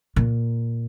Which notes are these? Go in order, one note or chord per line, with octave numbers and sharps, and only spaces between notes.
A#2